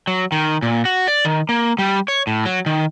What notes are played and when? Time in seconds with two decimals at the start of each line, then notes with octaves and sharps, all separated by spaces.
0.07 F#3
0.32 D#3
0.62 A#2
0.85 F#4
1.08 D5
1.25 D#3
1.49 A#3
1.79 G3
2.08 C#5
2.27 A2
2.45 F#3
2.66 D#3